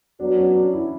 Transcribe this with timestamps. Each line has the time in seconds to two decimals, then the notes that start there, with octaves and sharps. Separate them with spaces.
0.20 F#3 B3 D4 F#4
0.38 C#4
0.55 D4
0.73 E4